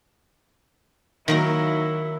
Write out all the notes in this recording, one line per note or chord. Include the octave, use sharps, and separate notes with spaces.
D#3 F#3 A#3 E4 A#4